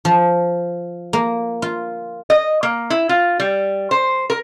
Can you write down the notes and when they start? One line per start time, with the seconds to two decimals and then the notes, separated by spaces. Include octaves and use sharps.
0.05 F3
1.13 A#3
1.62 F4
2.30 D#5
2.63 A#3
2.90 E4
3.09 F4
3.40 G3
3.91 C5
4.30 A#4